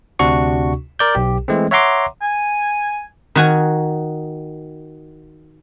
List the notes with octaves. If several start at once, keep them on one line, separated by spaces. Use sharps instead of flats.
D2 C3 D4 F#4 C#6
A#4 D5 G6
B1 G4
E3 G#3 A3 C4
C#5 E5 F#5 A#5 C6 D6
G#5
D#3 F#4 G#5